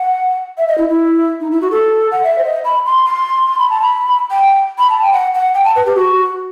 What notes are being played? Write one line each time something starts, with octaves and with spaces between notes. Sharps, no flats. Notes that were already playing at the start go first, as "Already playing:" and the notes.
Already playing: F#5
E5
D#5
E4
E4
D#4
E4
F#4
A4
F#5
E5
C5
D#5
B5
C6
C6
C6
B5
A5
B5
G5
B5
A5
G5
F#5
F#5
G5
A5
B4
G4
F#4